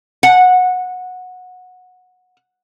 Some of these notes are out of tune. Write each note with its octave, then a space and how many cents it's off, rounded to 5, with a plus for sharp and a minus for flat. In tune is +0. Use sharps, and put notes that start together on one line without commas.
F#5 -15